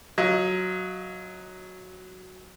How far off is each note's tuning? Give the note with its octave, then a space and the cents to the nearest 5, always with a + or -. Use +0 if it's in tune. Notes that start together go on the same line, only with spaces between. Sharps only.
F#3 +0 F4 +0 D#5 +20